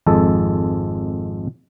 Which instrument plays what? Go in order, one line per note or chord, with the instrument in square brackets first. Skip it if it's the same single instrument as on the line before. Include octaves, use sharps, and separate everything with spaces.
[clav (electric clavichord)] G#1 F2 G#3 A4